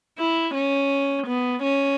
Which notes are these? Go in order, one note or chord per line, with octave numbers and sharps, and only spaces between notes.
E4
C#4
B3
C#4